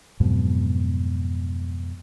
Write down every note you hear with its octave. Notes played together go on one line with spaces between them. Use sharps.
F2 G#2 B2 F#3